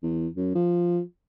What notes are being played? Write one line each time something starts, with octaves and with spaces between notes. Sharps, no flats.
E2
F#2
F3